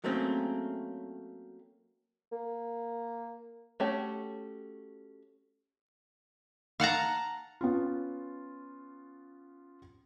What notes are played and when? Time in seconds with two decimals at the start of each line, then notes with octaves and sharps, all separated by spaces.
0.04 F#3 A3 A#3 C4 C#4 G#4
2.32 A#3
3.80 A3 C#4 F#4 G4 C#5
6.80 F5 F#5 A5 A#5
7.61 B3 C#4 F4